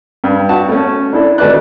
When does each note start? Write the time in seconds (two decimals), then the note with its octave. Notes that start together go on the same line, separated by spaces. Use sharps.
0.24 G2
0.49 F#4 A5
0.69 A3 C#4
1.13 D4 E4 A4
1.38 G#1 A3 B4 D5 F#6